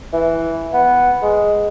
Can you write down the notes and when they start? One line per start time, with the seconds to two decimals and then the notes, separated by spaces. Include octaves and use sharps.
0.13 E3
0.74 B3
1.22 G#3